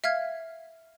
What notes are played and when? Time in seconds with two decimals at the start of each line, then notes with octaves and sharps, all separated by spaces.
0.04 E5 F5 F6 G#6